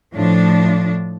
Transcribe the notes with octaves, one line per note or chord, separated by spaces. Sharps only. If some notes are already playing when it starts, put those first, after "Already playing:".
A2 F3 D4